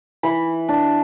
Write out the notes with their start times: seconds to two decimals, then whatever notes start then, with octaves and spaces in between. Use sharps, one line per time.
0.23 E3 B5
0.69 D4